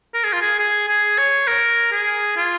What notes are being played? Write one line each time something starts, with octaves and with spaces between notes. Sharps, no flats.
A#4
G#4
F4
G#4
G#4
G#4
C#5
A#4
G#4
F4